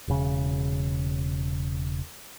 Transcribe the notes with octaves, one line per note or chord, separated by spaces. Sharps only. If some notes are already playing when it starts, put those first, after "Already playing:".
E1 C#3